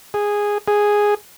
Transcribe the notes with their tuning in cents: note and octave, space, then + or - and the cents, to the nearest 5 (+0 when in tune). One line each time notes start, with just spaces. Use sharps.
G#4 -10
G#4 -5